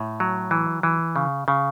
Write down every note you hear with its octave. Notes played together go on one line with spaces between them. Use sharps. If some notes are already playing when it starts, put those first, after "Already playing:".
Already playing: A2
F#3
E3
E3
C#3
C#3